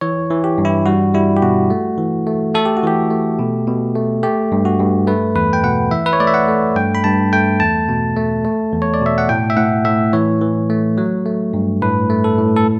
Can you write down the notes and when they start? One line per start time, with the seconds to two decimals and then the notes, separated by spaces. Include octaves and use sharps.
0.01 E3 C#5
0.30 E3
0.44 G4
0.58 G2
0.65 E4
0.86 G3 F#4
1.14 G3 E4
1.37 G4
1.42 B2 F#4
1.70 A3
1.98 E3
2.27 A3
2.55 A3 A4
2.66 G4
2.77 F#4
2.83 E3 G4
3.10 A3
3.39 B2
3.67 B2
3.95 A3
4.23 A3 G4
4.52 G2
4.65 F#4
4.79 G2
5.07 A3 B4
5.35 E2 B4
5.53 G5
5.64 B2 F#5
5.91 E3 E5
6.06 B4
6.13 C#5
6.20 A3 D5
6.27 E5
6.34 F#5
6.48 A3
6.76 G2 G5
6.95 B5
7.04 G2 A5
7.33 A3 G5
7.60 E2 A5
7.88 B2
8.17 A3
8.45 A3
8.73 E2
8.82 C#5
8.94 D5
9.01 B2
9.06 E5
9.18 F#5
9.29 A2 G5
9.50 E5
9.57 A2 F#5
9.85 A2 E5
10.13 E3 C#5
10.41 E3
10.70 A3
10.98 F#3
11.26 A3
11.54 G2
11.82 A2 B4
12.10 A3
12.24 A4
12.38 A2
12.56 A4